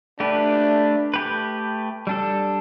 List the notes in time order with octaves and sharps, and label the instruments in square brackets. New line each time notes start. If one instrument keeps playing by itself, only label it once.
[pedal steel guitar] A3 G4 B4 [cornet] D4
[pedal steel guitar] A3 G4 B4
G3 D4 A4